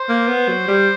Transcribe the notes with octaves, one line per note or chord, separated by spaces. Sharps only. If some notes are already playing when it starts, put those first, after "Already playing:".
Already playing: C5
A#3
B3
F#3
G3